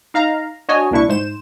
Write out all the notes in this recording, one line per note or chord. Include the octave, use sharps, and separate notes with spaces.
D#4 F5 A#5
D4 F#4 C#5 D#5 G#5
C2 A#2 D4 E4 C#6
G#2 C5 E7